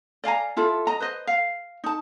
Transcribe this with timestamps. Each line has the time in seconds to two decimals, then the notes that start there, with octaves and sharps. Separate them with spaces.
0.24 D5 F5 G#5 A#5
0.57 E4 F4 A4
0.87 D#5 A#5
1.00 B4 C5 D#5
1.27 F5
1.84 D#4 A5